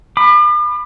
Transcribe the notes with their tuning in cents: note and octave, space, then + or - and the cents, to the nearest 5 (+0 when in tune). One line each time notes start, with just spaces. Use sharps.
B5 +0 D6 +45